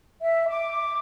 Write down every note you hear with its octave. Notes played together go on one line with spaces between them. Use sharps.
E5
D6